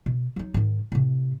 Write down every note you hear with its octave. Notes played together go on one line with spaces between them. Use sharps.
B2
F#3 D#4
G#2 D#3
A2 C3